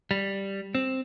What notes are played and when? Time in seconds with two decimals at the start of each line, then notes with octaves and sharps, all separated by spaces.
0.11 G3
0.75 C4